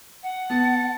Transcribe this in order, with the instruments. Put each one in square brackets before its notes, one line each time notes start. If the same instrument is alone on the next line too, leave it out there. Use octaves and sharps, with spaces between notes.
[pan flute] F#5
[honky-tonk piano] B3 [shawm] A5